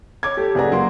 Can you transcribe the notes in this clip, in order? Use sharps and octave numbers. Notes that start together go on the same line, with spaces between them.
C#5 D6 G#6
G4 A4
F#1 G#4 B4 D5 F#5 A#5
F#3 A#3 F#5 C6